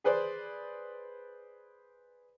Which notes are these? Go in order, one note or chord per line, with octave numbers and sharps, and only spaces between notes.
G#4 B4 C5 D5